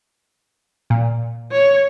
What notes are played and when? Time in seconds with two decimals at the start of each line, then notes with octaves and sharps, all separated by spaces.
0.90 A#2
1.52 C#5